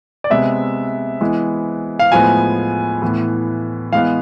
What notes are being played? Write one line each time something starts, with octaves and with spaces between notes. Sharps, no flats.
D5
C3 G#3 B3 E5
E3 G#3 B3
F5
A2 F3 G#3 B3 G#5
A2 E3 B3
E3 G#3 B3 F5